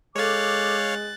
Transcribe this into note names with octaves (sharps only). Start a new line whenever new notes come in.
G#3 A4 C#5 F5 D6 F#6 A6